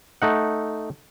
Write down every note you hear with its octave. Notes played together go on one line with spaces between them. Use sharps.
A3 D#4 F#5